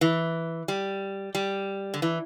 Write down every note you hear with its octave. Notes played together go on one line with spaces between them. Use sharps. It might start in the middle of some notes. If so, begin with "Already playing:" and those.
E3
G3
G3
D3
E3